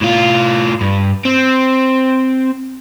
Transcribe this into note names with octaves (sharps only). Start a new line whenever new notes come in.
A2 F4
G2
C4